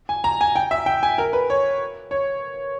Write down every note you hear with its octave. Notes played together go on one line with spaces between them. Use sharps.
G#5
A#5
G#5
G5
E5
G5
G#5
A#4
B4
C#5
C#5